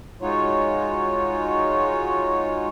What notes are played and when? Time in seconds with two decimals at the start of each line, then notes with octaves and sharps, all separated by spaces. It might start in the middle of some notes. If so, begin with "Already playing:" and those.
0.22 G#3 D#4 F4 F#4 C#5